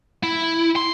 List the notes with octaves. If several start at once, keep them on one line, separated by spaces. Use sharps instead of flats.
E4
C6